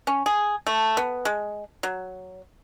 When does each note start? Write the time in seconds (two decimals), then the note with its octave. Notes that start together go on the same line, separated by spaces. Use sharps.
0.07 C#4
0.26 G#4
0.67 A3
0.97 B3
1.25 G#3
1.83 F#3